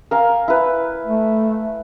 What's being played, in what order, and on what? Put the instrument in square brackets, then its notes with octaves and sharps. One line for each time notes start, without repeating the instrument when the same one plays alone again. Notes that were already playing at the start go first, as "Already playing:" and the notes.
[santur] A#4 F5 G#5
E4 B4
[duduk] A3